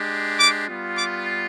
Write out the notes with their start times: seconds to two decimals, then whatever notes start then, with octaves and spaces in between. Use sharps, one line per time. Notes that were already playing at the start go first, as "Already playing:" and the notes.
Already playing: G#3 D4 G4
0.40 D6
0.69 G3 B3 F4
0.96 D6